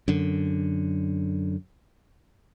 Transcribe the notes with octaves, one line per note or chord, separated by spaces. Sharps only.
F#2 D3